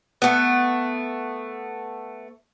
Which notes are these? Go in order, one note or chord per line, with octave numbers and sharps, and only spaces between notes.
A3 B3